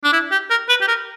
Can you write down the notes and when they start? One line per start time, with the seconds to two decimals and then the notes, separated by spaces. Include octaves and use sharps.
0.04 D4
0.13 E4
0.32 G4
0.50 A#4
0.69 B4
0.81 G4
0.88 A#4